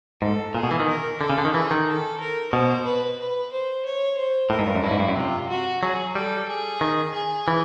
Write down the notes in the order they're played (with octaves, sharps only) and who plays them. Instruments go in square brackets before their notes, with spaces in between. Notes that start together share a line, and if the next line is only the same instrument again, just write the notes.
[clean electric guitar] G#2 [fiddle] A4
[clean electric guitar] A#2 [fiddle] G#4
[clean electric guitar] B2
E3
D#3
[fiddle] A#4
[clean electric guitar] D3 [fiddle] A4
[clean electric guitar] C#3
D3
D#3
[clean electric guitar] E3 [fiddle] G#4
[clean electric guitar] D#3
[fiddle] A4
A#4
[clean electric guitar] B2 [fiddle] C5
[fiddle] B4
B4
C5
C#5
C5
[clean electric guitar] A2 [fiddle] A#4
[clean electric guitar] G#2
G2
F#2
[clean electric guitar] G2 [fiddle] E4
[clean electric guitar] G#2
G2
F#2
[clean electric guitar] C3 [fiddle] F4
[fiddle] F#4
[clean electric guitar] F#3 [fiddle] G#4
[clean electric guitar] G3 [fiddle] A4
[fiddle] G#4
[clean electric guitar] D#3
[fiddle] G#4
[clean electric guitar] E3